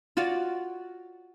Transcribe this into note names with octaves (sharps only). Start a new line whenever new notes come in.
F4 F#4 C#5 D5